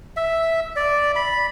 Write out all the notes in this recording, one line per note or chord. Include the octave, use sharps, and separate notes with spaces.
E5
D5
B5